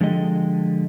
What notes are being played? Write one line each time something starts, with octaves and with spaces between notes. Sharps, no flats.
D3 F3 G#3 G4 A4 D#5